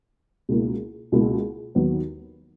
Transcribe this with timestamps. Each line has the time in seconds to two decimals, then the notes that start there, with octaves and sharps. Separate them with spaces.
0.49 C#2 B2 A#3 E4
1.12 C#2 B2 A#3 E4
1.75 D#2 D#3 F#3 B3